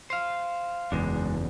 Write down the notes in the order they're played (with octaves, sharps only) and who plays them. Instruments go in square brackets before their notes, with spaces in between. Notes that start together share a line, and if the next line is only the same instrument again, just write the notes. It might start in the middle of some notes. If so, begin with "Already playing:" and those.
[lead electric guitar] C5 F5
[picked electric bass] F#1 E2 [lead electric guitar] G#3 D4